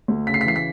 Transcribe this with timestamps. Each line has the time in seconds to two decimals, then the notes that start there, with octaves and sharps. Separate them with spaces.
0.08 D2
0.27 C#3 B6
0.34 C7
0.41 B6
0.45 E3 C7
0.56 B6